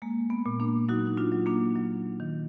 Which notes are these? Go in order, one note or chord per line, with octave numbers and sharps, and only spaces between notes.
G#3 A#3
B3
A#2
A#3 D4
F#3 D#4 F#4
D#4
D4 F4
F#3
A#3 D4
F#3
D#3